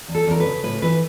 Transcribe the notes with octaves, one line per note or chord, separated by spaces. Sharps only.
E2
A4
E2 A#4
B4
C#3
A2 B4
E3 B4